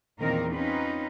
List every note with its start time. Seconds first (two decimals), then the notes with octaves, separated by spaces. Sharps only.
0.21 E2 A#2 D#3 C4 D#4 A#4
0.53 C4 C#4 D#4 F4 B4